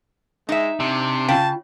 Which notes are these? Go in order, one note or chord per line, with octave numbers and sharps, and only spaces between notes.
G#3 D#4 E5
C3 D4
C#3 F4 G5 A5